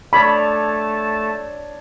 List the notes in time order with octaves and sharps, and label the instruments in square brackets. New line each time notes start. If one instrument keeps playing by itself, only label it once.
[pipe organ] A3 A5 [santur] D4 C#5 D5 [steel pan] B5